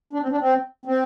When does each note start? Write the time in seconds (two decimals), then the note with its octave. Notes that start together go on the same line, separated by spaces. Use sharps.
0.13 D4
0.22 C4
0.31 D4
0.40 C4
0.86 C4